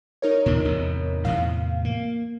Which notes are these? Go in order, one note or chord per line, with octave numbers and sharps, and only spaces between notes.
D#4 A#4 C#5
D#2 A#2 D4
A1 E2 C3
E2 A2 C3 F5
A#3